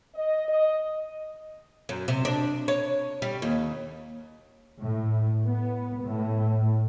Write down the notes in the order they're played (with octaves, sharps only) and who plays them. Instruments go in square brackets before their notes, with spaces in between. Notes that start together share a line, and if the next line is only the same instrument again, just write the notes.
[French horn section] D#5
D#5
[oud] F#2
C3
D4
C#5
G3
D#2
[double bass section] A2
B3
A2